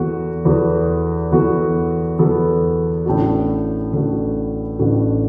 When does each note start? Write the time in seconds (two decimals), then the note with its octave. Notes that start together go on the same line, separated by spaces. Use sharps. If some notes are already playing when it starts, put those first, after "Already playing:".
Already playing: E2 E3 B3 F#4 A4
0.45 E2 E3 B3 F#4 A4
1.32 E2 E3 B3 F#4 A4
2.18 E2 E3 B3 F#4 A4
3.06 A1 A2 A3 D4 F#4
3.93 A1 A2 A3 D4 F#4
4.79 A1 A2 A3 D4 F#4